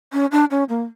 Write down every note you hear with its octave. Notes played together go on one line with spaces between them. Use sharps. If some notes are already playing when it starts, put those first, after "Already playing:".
C#4
D4
C#4
A#3